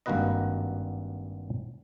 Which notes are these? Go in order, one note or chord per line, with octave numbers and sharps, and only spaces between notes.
G#1 G2 A#3 F#4 B4 D#5